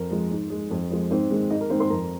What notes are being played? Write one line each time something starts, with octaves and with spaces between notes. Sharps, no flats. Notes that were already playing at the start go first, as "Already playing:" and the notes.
Already playing: F2 A#4
F3 G#3
G#2
G#3
F2
F3 G#3
G#2 C4 C5
D#3 G#3
G#2 D#4 D#5
A#4
D#3 G#3 C4 C5
C5 C6
F2 A#4 A#5